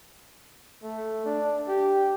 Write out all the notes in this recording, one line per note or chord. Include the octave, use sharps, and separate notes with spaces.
A3
D4
G4